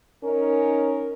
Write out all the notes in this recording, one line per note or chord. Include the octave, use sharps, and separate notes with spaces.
C#4 D#4 A#4